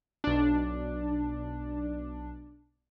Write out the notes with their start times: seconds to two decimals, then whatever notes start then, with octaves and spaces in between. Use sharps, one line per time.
0.24 B1 D4